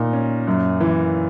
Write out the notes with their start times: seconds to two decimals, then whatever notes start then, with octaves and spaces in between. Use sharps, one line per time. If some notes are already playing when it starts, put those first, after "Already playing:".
Already playing: A#2 D#4
0.13 C#4
0.47 F#2
0.80 E3